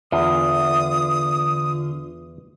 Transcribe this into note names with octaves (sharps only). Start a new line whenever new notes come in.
E2 D3 F4 D#6